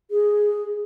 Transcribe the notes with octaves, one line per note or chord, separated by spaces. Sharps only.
G#4